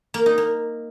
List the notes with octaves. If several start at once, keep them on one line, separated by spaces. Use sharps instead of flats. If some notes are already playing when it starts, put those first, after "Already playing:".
A#3
D#4
A#3